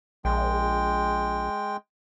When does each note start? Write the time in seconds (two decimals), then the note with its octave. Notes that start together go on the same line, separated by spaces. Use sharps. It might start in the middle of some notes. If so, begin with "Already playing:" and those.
0.25 A#1 G#3 G5